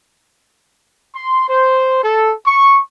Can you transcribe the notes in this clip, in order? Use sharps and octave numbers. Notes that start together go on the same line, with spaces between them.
C6
C5
A4
C#6